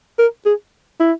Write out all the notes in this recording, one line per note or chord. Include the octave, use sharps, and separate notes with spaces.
A#4
G#4
E4